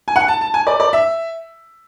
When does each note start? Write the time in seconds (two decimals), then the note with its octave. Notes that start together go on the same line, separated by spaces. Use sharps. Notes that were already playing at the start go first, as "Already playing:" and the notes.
0.08 G#5
0.16 F#5
0.28 A5
0.41 A5
0.54 G#5
0.67 D5
0.80 D5
0.93 E5